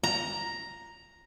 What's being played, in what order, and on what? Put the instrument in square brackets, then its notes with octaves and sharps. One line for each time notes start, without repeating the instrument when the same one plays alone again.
[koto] A#5